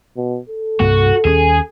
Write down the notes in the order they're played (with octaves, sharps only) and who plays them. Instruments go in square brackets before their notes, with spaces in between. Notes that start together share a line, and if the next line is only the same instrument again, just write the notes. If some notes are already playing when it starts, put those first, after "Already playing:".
[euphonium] B2
A4
[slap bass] C2 G2 A#3 [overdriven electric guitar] F#4
[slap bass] D#2 A3 C#4 [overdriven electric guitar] G#4